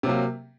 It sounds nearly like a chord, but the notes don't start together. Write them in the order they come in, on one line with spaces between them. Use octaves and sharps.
C3 F#3 A#3